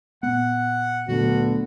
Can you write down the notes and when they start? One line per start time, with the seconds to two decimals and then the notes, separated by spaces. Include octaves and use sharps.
0.23 A#2 B3 F#5
1.08 D2 A#2 D3 F#3 B3 F#4